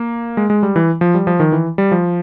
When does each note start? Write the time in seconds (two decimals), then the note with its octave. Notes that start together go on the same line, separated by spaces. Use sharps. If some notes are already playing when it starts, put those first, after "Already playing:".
Already playing: A#3
0.37 G#3
0.50 G#3
0.63 G3
0.76 E3
1.01 F3
1.15 G3
1.27 F3
1.40 D#3
1.52 E3
1.78 G3
1.92 F3